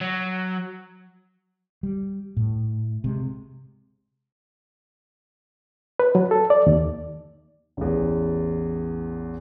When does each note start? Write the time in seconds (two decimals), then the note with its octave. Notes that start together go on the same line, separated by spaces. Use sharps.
0.01 F#3
1.83 G3
2.37 A2
3.04 C3 G#3
6.00 B4
6.15 F#3
6.31 A4
6.50 D5
6.67 D#2
7.77 A1 E2